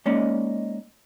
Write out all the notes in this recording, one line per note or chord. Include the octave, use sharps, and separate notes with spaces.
G#3 A#3 C#4 D#4 C#5 D5